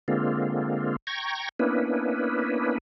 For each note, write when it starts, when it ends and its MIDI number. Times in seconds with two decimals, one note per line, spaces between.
0.08 0.96 50
0.08 0.96 56
0.08 0.96 58
0.08 0.96 60
0.08 0.96 65
1.07 1.49 79
1.07 1.49 82
1.07 1.49 85
1.07 1.49 92
1.59 2.78 58
1.59 2.78 59
1.59 2.78 61
1.59 2.78 62
1.59 2.78 64
1.59 2.78 71